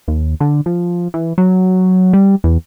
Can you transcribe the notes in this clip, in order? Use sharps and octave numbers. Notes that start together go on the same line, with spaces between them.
D#2
D3
F3
E3
F#3
G3
E2